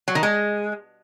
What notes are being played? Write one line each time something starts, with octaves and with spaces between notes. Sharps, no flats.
F#3
D#3
G#3